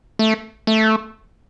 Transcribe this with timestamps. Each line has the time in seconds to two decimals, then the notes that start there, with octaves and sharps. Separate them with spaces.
0.19 A3
0.67 A3